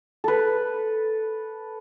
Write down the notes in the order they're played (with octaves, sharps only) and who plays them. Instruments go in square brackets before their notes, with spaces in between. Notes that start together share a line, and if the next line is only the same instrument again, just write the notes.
[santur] A4 B4